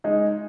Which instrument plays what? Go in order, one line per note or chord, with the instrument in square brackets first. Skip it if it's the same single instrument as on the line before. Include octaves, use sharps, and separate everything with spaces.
[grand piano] G#3 D#4 G#4